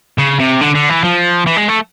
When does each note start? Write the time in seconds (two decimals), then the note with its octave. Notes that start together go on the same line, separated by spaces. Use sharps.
0.18 C#3
0.39 C3
0.61 D3
0.75 D3
0.89 E3
1.04 F3
1.46 E3
1.57 G#3
1.69 A3